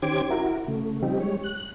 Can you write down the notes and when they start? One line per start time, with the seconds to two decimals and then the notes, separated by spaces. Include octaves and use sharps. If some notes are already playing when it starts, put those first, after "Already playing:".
0.02 D#3 C#4 G4 C5 D6 G#6
0.30 E4 F#4 A#4
0.68 C#3 A3
1.02 F3 G3 C4 D#4 G4
1.20 G3 G#3 C#5
1.44 F#6